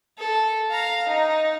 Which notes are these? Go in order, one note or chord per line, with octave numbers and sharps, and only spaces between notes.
A4
F5 A#5
D#4